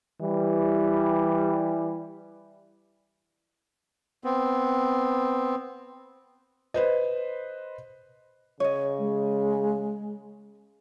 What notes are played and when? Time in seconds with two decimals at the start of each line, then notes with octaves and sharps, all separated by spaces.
0.20 E3 G3
4.24 B3 C4
6.74 B4 C5 D#5
8.60 C#3 C#5 D#5
8.98 G#3